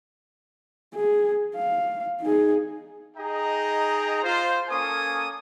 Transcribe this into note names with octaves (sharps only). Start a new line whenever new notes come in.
G#4
F5
D#4 G#4
D#4 G#4 D#5 G5 A#5
F4 C5
A#3 C#4 A4 G#5 C#6 D#6